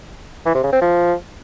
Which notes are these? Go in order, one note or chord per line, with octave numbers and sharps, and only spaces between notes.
E3
C3
C#3
C4
F3